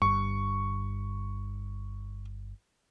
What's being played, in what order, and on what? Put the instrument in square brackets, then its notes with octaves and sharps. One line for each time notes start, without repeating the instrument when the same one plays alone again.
[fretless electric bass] G1 G2 [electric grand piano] C#6